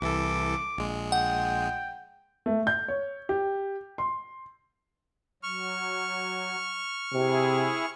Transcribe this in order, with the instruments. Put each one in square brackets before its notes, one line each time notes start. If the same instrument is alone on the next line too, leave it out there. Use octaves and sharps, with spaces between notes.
[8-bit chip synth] C2 E3 A4 [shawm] D6
[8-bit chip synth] A#1 G#3
[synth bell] F#5 [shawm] G5
[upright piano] A3
G6
C#5
G4
C6
[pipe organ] F#3 [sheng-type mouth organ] C#6 F6
[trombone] C3 [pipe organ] E4 G#4